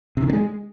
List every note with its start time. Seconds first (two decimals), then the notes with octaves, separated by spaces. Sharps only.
0.17 C3
0.22 D#3
0.28 D3
0.33 G#3